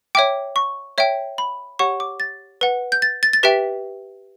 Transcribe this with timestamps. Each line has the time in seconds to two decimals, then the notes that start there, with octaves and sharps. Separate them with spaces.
0.15 C#5 E5 G5 D6
0.56 C#6
0.98 C#5 E5 G5
1.38 B5
1.79 G4 C#5 F#5 C#6
2.00 D6
2.20 A6
2.61 B4 F#5
2.92 G6
3.02 A6
3.23 A6
3.33 A6
3.43 G4 B4 E5 G5 B6